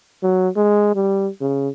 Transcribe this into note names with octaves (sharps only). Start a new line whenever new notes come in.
F#3
G#3
G3
C#3